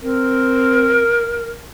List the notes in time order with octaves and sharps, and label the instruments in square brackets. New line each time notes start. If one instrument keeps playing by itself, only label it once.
[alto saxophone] C4 [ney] A#4